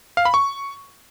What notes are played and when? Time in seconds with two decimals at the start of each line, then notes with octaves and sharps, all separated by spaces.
0.17 F5
0.25 B5
0.34 C#6